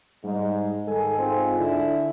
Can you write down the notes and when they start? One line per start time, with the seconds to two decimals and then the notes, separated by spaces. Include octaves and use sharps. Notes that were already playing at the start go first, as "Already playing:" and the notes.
0.24 G#2 G3 G#3
0.87 G#2 D#3 A4 G#5
1.18 C4 F4
1.57 D3 E4